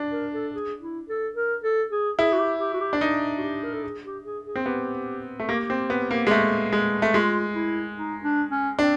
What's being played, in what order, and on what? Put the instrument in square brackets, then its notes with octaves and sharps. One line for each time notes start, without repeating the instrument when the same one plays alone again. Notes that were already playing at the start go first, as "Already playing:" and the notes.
Already playing: [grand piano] D4
[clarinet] A#4
A4
G#4
E4
A4
A#4
A4
G#4
[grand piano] E4 [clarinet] G#4
[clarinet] F#4
G4
G4
F#4
G4
[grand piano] D4
D#4
[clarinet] F#4
G4
A#4
A4
G#4
G4
G#4
G#4
[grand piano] C4
[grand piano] B3 [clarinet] G4
[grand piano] A3
[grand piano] A#3 [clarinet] G4
[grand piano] C4
B3
A#3
G#3
A3
G#3
A3
[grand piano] G#3 [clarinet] F4
[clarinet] E4
D#4
D4
C#4
[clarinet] C4 [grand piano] D4